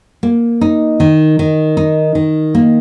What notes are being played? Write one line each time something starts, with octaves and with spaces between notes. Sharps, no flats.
A#3
D#4
D#3
D#3
D#4
D#3
A#3